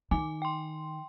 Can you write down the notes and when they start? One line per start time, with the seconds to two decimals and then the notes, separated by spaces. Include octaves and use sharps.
0.11 D#3 G#5 D6
0.42 G5 C6